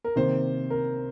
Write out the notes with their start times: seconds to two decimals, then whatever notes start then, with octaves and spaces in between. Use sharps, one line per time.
0.04 A#4
0.16 C3 D#3 A#3 C5
0.70 A#4